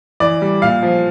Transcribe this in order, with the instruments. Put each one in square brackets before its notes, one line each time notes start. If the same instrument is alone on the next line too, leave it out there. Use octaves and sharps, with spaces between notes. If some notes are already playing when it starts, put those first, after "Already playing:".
[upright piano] E3 D5
G3
A#2 F5
F3